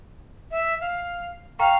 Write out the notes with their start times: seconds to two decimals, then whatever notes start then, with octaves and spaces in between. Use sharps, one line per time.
0.51 E5
0.81 F5
1.59 F5 G5 A#5 C#6